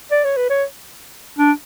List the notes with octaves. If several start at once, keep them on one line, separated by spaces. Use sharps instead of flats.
D5
C#5
B4
C#5
D4